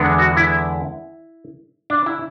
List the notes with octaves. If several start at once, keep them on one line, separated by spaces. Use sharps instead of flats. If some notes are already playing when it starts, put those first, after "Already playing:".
Already playing: E2 D3 G#3 B3 D4
F#4
E4
D4
E4